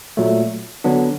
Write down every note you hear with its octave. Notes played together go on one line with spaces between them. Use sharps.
A#2 F#3 A3
D3 F#3 B3 D4